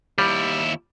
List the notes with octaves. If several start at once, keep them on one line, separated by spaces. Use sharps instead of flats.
D#2 G3 E4